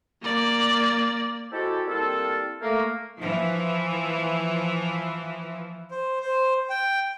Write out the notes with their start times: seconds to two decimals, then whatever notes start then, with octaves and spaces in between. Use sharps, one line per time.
0.22 A#3 D5
1.52 G#3 C4 E4 F#4 G4 A4
1.88 G3 A#3 C4 E4 F4 A4
2.62 A3 A#3
3.18 E3 F3
5.91 C5
6.21 C5
6.70 G5